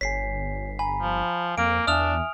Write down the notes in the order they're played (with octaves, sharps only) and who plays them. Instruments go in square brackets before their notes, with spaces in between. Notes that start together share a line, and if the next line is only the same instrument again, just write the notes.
[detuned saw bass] G1 [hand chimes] C#5 G#5 [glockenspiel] B6 C7
[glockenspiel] G#5 [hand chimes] A#5 B5
[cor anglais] F3
[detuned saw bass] F2 [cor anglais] A#3 [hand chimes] F5 F6 [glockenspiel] D7
[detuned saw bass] E2 [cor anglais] D4 [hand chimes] E5 G#5 [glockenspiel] D#6 F6 F7